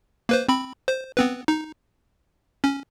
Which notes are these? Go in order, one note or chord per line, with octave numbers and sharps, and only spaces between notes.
A#3 B4 C5
C4 B5
C5
B3 C4 B4
D#4
C#4